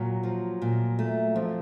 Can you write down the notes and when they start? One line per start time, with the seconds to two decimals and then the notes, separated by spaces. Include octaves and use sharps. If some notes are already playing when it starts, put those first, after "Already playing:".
Already playing: A#2 F#3
0.23 F3
0.62 A#2
0.99 A3
1.35 F2 F3